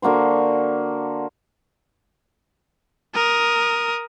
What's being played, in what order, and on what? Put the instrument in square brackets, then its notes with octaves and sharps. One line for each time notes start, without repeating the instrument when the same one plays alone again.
[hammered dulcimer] D3 A#3 F#4 C5
[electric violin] A#4 D#6